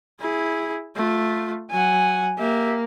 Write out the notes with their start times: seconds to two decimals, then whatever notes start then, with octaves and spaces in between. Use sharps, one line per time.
0.20 E4 G#4
0.96 A3 F4
1.71 F#3 F#5 G#5
2.38 A#3 G4 E5